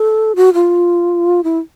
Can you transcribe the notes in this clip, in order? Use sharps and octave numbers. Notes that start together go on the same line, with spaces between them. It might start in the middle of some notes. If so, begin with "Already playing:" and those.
Already playing: A4
F#4
F4
E4